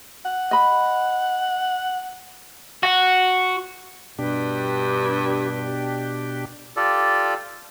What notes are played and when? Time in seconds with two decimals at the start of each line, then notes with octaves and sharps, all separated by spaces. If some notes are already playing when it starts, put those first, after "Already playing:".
0.25 F#5
0.51 D#5 B5
2.83 F#4
4.19 G2 B2 D4 G4
6.76 F4 G4 A4 D5